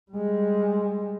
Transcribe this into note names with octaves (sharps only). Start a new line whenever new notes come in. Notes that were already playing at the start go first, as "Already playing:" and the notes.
G3 G#3